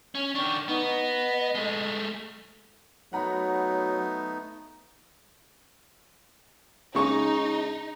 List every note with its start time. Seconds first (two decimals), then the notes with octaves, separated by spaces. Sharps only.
0.15 C#4
0.35 D#3 D4 C#6
0.68 B3 D#4
0.87 D#5
1.55 G#3 A3
3.13 F#3 A3 B3 D#4 F#5 A#5 B5
6.95 C#3 G#3 D#4 C#6